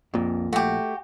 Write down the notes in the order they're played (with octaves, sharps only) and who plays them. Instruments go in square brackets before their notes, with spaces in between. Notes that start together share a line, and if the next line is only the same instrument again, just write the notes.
[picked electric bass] A#1 A#2 [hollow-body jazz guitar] F2
[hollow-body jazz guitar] A3 [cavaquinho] F#4 G4